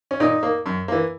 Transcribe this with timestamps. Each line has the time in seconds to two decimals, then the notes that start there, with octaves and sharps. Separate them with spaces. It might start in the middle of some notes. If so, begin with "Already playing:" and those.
0.11 C#4
0.20 A#2 D#4
0.43 A#3
0.66 F#2
0.88 E3 A#3